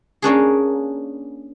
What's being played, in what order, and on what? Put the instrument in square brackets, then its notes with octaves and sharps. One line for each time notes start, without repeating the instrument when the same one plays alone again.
[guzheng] A#3 C#4 D4 G#4